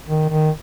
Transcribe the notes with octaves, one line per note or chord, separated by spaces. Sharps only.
D#3
D#3